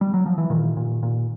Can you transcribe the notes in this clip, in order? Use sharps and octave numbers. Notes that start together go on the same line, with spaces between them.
G3
F#3
F3
E3
A#2 D#3
A#2
A#2